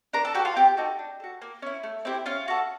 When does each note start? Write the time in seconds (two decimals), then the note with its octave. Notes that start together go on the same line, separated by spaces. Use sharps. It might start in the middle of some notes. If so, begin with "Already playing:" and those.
0.13 D4 A#4 A#5
0.25 A4 A5
0.34 F#4 G4 G5
0.39 A4
0.45 F4 F5
0.55 C4 G4 G5
0.77 D#4 F#4 A4
0.99 D4
1.20 F#4 A4
1.42 A#3
1.62 C#4 E4
1.83 A3
2.05 C4 E4 G4
2.26 C#4 F4 F5
2.48 F#4 A4